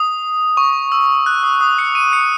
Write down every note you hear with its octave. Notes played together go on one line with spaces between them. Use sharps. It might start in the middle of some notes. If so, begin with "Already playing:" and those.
Already playing: D#6
C#6
E6
F#6
D#6
D#6
C#7
D#7
C#7